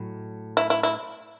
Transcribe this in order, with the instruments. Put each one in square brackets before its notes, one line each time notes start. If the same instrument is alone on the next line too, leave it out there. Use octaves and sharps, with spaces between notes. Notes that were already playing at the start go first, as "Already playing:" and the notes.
Already playing: [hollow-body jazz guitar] A2 F#3
[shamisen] E4
E4
E4